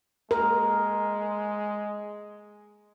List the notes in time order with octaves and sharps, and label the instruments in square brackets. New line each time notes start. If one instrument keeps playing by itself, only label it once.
[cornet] G#3 [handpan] A#4